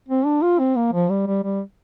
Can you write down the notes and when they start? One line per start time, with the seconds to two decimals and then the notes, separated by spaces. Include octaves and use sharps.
0.09 C4
0.26 D4
0.42 F4
0.59 C4
0.76 A#3
0.93 F3
1.10 G3
1.27 G3
1.43 G3